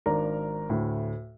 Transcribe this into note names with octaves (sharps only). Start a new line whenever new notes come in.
G#1 D4 A#4 A#5
D2 A2